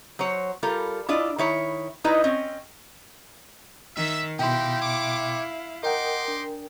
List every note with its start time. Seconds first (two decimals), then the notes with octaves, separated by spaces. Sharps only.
0.19 F#3 C5 C#5
0.63 G3 F4 A4 A#4
1.09 D4 E4 F4 D5 D#5
1.38 D#3 E4 C#5
2.04 D#4 E4 B4 D5 D#5
2.24 C4 C#4 D#5
3.96 D#3 E5
4.39 B2 D#4 E4 G4 F5 G5 C6
4.80 C#5 D6
5.83 D#4 A#4 D#5 F#5 G5 C6 D6
6.28 D4